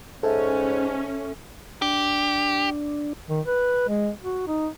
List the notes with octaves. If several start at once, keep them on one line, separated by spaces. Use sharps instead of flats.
G#2 C#4 A4 E5
D4 G4
D#3
B4
G#3
F#4
D#4